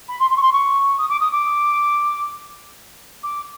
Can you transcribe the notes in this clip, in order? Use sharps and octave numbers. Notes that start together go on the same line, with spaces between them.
B5
C6
C6
C#6
C6
C#6
D#6
D6
D#6
D6
D6